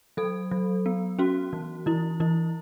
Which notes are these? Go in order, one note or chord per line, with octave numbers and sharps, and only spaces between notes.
F#3 A4
F#3
B3
C#4 F#4
E3
E3 E4
E3 E4